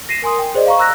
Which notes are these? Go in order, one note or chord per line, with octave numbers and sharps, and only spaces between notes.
A#6 C7 D#7 E7
A#4 G#5 C6 D#6
G5
G#4 C5 D5 D#5
F5 A#5 C#6
A#5 E6 F#6 A#6